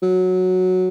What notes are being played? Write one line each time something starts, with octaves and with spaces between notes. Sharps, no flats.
F#3